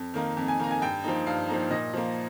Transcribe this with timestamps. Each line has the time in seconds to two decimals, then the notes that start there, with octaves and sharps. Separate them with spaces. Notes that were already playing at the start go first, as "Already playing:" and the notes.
Already playing: F2
0.14 D#3 A#3 D#4
0.37 F2
0.48 G#5
0.59 D#3 A#3 D#4 A#5
0.71 G#5
0.82 G2 G5
1.04 F3 A#3 D#4
1.27 G2 F5
1.49 F3 A#3 D#4
1.70 A#2 D#5
1.94 F3 A#3